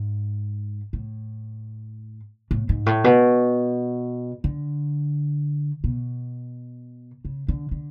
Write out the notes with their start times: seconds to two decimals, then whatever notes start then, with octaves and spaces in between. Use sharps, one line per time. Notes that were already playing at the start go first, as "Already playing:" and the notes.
Already playing: G#2
0.93 A2
2.51 A2
2.69 G#2
2.86 A2
3.04 B2
4.44 D3
5.84 B2
7.25 C#3
7.48 D3
7.71 D3